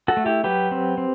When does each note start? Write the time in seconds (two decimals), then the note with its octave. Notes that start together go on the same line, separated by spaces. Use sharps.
0.08 F#4 A4
0.17 A3
0.26 E4 G4
0.44 F#3 G4 B4
0.71 C4
0.98 C4